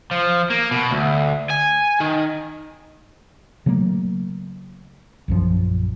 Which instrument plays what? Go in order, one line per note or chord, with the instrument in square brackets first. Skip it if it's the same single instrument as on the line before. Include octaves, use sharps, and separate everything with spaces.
[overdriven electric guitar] F3
A#3
B2
D2
G#5
D#3
[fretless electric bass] C#3 F#3 A3 A#3
A#1 F#2 F3